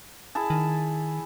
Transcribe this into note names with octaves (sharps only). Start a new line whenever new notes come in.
E4 G#4 A5
D#3